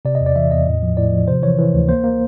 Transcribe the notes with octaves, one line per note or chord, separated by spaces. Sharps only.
C3 D5
D#5
E2
D5
E3 E5
E2 D#5
A2
F3
A2 D5
F3
C3 C5
E3 C#5
E3
D2
A#3 C5
A#3